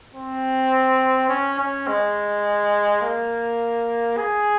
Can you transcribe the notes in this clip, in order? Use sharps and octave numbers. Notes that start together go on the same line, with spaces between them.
C4
C#4
C#4
G#3
A#3
G#4